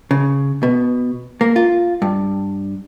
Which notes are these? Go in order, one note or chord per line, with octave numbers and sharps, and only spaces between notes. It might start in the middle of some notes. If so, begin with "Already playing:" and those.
C#3
B2
A#3
F4
G2